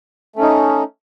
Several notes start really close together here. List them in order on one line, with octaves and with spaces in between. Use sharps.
A3 C#4 D#4